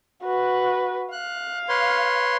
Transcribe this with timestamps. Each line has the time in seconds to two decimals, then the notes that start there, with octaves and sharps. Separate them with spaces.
0.23 F#4 B4
1.12 F5 F#6
1.69 B4 C#5 C6